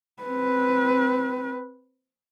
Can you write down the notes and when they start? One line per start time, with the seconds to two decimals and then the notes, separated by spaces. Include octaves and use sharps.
0.23 C4 B4